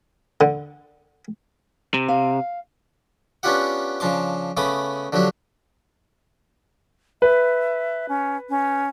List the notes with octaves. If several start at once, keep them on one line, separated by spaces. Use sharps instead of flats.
D3
C3
F5
B3 C#4 D4 F4 G4 F#5
C#3 F3 D4 C6 D6
C#3 A3 B3 B5 D6 D#6
D3 F3 F#3 D4 G4
B4 E5
C#4
C#4